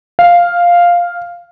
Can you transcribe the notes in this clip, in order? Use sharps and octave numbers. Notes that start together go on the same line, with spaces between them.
F5